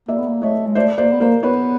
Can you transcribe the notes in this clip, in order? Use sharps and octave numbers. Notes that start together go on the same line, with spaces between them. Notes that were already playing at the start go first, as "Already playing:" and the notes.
A#3 D5 E5
B3
A#3
A3 C#5 D#5
G#3
A3 C5 D5
A#3 C5 D5
B3
A#3 A#4 C5
B3 B4 C#5